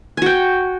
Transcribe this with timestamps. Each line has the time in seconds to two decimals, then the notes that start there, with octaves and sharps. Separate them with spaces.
0.17 G#5
0.22 F#4
0.26 G5